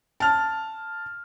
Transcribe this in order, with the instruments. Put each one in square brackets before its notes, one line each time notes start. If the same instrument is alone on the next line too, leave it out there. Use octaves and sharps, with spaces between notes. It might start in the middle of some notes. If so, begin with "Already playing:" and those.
[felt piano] A5 F6